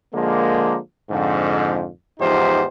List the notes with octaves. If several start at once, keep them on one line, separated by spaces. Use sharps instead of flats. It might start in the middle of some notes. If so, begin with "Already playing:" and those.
D3 F3 G#3 A#3
F2 G#2 D3
E2 G#2 F3 D#4 G4 C5